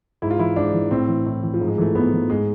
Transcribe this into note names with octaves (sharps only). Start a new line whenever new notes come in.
G#2 E4
F4
E3 E4
G#2 D4
E3
A2 C4
E3
A2
E3
F3
G#2
G#3
E3 A3
G#2 B3
E3
G#2 G#3